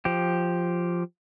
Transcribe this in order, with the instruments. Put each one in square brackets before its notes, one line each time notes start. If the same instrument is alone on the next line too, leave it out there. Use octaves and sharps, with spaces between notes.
[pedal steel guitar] F3 G4